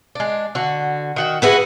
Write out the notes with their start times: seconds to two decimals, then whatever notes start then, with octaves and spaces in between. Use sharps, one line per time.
0.15 G#3 D4
0.55 D3 F#4
1.16 D#3 F#4 G5
1.42 B3 E4 F#4 G#4 B4 F#5